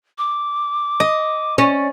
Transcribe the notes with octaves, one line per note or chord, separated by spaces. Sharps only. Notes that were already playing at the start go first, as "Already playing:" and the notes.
D6
D#5
C#4 D5